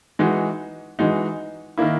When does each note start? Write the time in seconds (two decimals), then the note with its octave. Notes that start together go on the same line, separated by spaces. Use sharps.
0.19 E3 G#3 D#4 F#4
0.99 E3 G#3 D#4 F#4
1.78 D#3 A#3 E4